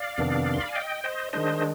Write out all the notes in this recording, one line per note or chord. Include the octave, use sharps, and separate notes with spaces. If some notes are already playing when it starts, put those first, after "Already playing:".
Already playing: D5 F5
F2 C3 D#3 B3 D4
C6
B5
G#5
D#5 G5
C5 D#5
D#3 G#3 D4 C5 D#5
D#5